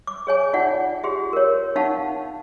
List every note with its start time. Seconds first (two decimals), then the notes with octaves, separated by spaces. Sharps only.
0.07 D6
0.27 G#4 C#5 G#5
0.53 D#4 F4 D5 F#5
1.03 F4 G4 G#4 C6
1.33 A#4 C#5
1.76 D#4 F5 F#5 A5 C#6